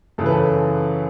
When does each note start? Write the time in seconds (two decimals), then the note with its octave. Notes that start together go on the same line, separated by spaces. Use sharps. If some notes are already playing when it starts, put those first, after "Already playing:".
0.18 F#2 C#3 E3 A4
0.26 B4
0.33 A4